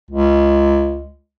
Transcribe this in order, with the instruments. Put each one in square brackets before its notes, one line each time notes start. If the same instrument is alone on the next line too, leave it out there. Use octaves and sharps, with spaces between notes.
[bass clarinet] C#2